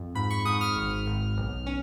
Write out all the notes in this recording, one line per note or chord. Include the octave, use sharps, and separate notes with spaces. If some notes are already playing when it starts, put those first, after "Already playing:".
Already playing: F2
G#2 B5
C#6
G#2 D#6
F6
G#1
G#1
B1
C#4